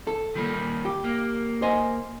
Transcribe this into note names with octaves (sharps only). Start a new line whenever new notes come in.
A4
D#3 G3 A#3
G4
A#3
C5 D#5 G#5